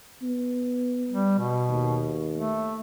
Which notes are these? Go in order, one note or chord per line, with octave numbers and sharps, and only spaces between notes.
B3
G3
B2
D#2
A3